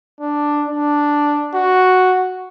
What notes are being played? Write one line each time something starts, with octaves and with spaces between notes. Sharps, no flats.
D4
D4
F#4